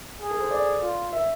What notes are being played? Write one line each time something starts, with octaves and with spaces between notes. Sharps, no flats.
G#4
A4
C5
D5
F4
E5